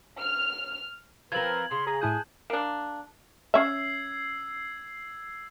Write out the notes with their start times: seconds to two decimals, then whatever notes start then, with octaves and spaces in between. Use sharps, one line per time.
0.20 F6
1.32 F3 C4 A#4 B4 G#6 F#7
1.71 C#3 C6
1.87 G#4 A#5
2.01 A2 E4 G#4 A5 D#6 F#6 G6
2.50 A#3 D4
3.54 C#4 E5 E6 G#6 C7